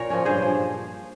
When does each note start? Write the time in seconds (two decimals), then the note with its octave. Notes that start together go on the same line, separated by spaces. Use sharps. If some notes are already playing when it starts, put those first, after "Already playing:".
Already playing: A#2 A#4 C#5 F5
0.10 F3 A#3 C#4
0.25 G2 G#4 C5
0.42 F3